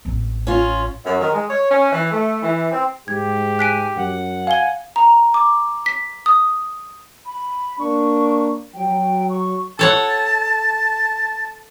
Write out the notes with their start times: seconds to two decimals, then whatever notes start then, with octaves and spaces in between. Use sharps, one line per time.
0.05 A1 C4
0.47 C#4 F4
1.05 F#2
1.21 D#3
1.32 G#3
1.49 C#5
1.70 C#4
1.91 E3
2.11 A3
2.42 E3
2.72 C4
3.08 G#2 G4 G#6
3.59 G#5 F#6 B6 D7
3.97 F#2 F#5
4.47 F5 G#5 G7
4.96 A#5
5.34 D6
5.86 B6
6.26 D#6
7.26 B5
7.79 A#3 D4 C#6
8.75 F#3 G5
9.30 C#6
9.79 A4 C#5 F#5 A5